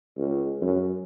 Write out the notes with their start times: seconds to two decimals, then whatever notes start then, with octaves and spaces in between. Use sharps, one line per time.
0.17 C#2
0.62 F#2